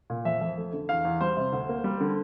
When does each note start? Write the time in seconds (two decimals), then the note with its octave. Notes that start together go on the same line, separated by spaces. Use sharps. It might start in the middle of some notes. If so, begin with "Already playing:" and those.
0.10 A#2
0.25 F2 E5
0.41 F2
0.58 A3
0.73 D3
0.89 E2 F5
1.05 E2
1.21 G3 C5
1.37 C3
1.53 D2
1.69 A#3
1.84 G3
2.01 D3